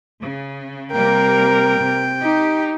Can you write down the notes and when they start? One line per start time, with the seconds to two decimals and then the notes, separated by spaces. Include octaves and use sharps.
0.20 C#3
0.92 C3 G3 A#3 A#4 G5
1.78 C3
2.22 D#4 G4